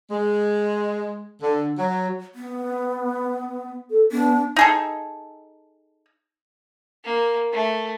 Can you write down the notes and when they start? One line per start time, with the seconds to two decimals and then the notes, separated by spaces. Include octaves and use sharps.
0.10 G#3
1.42 D3
1.78 F#3
2.35 B3
3.91 A4
4.12 B3 D4
4.56 D#4 G#4 A4
7.04 A#3
7.53 A3